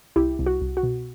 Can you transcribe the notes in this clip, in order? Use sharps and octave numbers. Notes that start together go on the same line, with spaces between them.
C2 E4 G4
C2
F#4
C2
F#4
B2